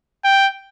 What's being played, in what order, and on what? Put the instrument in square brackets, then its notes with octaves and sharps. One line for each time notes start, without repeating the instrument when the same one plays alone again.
[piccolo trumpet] G5